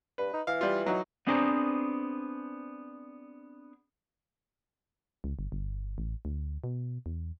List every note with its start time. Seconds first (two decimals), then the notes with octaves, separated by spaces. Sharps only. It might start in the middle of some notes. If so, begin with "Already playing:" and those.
0.18 G2 B4
0.34 D#4
0.47 E3 F5
0.61 G3 F4
0.86 F#3 D#4 F#4
1.27 B3 C4 D4 G#4 C5 A#5
5.24 C#2
5.39 G1
5.52 G1
5.98 A1
6.25 D2
6.64 B2
7.06 E2